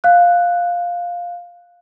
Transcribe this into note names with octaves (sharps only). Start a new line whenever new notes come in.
F5 F#6